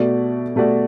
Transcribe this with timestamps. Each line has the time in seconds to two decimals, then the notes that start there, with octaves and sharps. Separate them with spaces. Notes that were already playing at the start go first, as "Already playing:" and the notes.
Already playing: B2 A3 F#4 D5
0.56 B2 A3 F#4 D5